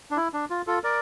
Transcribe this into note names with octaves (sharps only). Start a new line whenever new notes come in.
D4
E4
D4
F4
F4 A4
A#4 D5